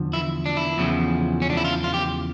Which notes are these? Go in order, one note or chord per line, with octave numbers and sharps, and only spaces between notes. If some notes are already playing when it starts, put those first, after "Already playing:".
Already playing: E2 D3 F3
E4
D4
E4
E2 C#3 F3
C#4
D4
E4
F4
F4
G4